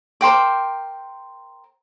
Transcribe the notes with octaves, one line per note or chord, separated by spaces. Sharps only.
A#4 C5 G5 D6